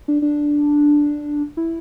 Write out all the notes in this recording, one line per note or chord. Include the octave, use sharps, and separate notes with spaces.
D4
D4
E4